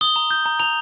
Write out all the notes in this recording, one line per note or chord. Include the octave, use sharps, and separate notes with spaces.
D#6 G7
A#5
G6
A#5
A#5 F7